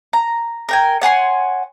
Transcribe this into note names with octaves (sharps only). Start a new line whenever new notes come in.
A#5
A#4 G5 G#5
C#5 F#5 G#5 C6